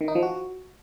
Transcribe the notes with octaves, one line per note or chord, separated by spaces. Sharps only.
D#3
D#4
F3
F#4